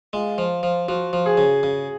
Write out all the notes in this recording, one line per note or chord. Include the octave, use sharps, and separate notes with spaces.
G#3 F4
F3
F3
F3 F#4
F3
G#4
C#3
C#3